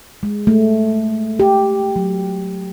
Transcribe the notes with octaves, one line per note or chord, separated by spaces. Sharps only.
G#3
A3
G4
F#3